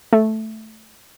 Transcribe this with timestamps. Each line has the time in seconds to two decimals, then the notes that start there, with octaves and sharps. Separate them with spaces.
0.13 A3